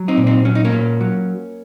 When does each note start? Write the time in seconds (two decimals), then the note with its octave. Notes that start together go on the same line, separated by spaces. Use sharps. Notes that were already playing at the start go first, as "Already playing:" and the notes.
Already playing: F#3
0.08 C4 D#4
0.17 A#2
0.27 C4 D#4
0.45 F#3 C#4
0.55 D#4
0.65 A#3 C#4
0.72 A#2
1.01 F#3